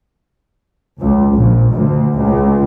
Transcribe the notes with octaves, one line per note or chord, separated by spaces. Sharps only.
C#2
A#1
D2
C#2